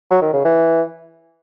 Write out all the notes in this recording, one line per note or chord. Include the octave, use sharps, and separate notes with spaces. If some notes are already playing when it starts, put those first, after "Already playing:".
F#3
D#3
C#3
E3